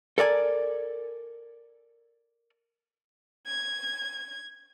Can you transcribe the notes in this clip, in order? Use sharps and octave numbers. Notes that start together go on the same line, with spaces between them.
A4 A#4 D5 G#5
G#6